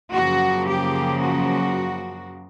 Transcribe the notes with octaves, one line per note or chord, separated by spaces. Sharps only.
F#2 C#3 F3 A#3 F#4
G4
F#4